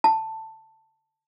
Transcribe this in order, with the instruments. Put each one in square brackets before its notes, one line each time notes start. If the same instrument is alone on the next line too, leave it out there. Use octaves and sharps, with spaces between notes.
[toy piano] A5